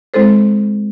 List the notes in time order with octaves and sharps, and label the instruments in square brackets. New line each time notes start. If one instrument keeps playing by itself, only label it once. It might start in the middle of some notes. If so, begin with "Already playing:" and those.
[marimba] G#3 C4 E4 A4 C5